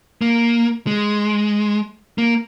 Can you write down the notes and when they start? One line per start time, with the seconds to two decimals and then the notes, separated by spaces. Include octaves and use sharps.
0.21 A#3
0.87 G#3
2.18 A#3